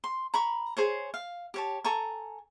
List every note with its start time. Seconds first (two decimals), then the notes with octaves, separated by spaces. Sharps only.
0.04 C6
0.34 A#5 B5 C#6
0.77 G#4 C5 C#5
1.14 F5
1.54 G4 C#5 A5
1.84 A4 G#5 A#5 C#6